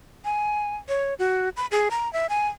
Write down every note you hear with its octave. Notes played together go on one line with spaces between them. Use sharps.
G#5
C#5
F#4
B5
G#4
A#5
E5
G#5